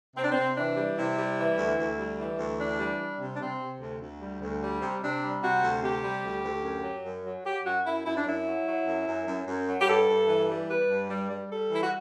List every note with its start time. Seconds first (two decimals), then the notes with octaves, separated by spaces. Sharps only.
0.15 C3 C4
0.23 D4
0.31 C3 C4
0.56 E3 D4
0.76 G3
0.96 C3 E4
1.17 G3
1.37 E3
1.57 D2
1.78 D2
1.98 G3
2.18 E3
2.38 D2
2.59 E3 D4
2.78 G3
2.99 G3
3.19 C3
3.35 D4
3.39 C3 C4
3.60 C3
3.80 D2
4.00 D2
4.20 G3
4.41 D2
4.61 G3
4.81 C3
5.01 C3 D4
5.22 G3
5.42 C3 F#4
5.62 D2
5.83 C3 G4
6.03 G3
6.23 D2
6.43 D2
6.63 F#2
6.83 F#3
7.03 F#2
7.24 F#3
7.44 F#3 G4
7.64 F#2 F#4
7.85 F#2 E4
8.05 F#2 E4
8.16 D4
8.25 F#2 E4
8.45 F#3
8.66 F#3
8.86 F#2
9.06 F#2
9.27 F#2
9.47 F#2
9.67 F#3
9.80 G4
9.87 G2 A4
10.07 G2
10.28 E3
10.48 G3
10.68 G3 B4
10.89 G2
11.09 G3
11.29 G3
11.49 G3 A4
11.70 E3 E4
11.82 F#4